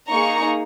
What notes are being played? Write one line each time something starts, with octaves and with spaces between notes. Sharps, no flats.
A#3 D#4 G#4 A#5 C#6